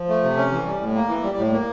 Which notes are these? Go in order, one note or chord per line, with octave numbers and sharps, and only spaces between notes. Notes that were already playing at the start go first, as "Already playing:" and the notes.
Already playing: F3
A3
C3
C#4
E3
G3
A2
A#3
E3
G3
A2
A#3